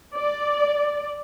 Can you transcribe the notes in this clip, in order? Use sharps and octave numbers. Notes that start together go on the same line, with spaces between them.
D5